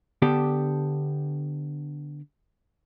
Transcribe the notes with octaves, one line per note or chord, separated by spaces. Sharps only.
D3 B3 D4 G4 A4